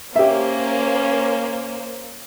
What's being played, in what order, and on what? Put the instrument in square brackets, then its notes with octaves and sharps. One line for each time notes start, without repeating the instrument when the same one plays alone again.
[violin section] A#3 C5 [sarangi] C#4 [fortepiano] G4 E5